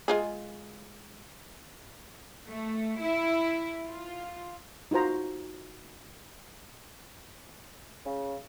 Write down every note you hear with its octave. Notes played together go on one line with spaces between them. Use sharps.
G#3 F4 G#4
A3
E4
F4
D#4 F4 F#4 C5 A#5
C#3